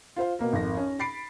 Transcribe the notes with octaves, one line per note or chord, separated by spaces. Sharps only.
F4 C5 F5
B2 A#3 A#4
G#1 F2 A#4 A#6
C#4
B5 A6 C7 D7